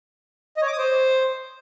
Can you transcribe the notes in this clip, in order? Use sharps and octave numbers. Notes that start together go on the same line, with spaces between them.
D#5
C#5
D6
D#6
C5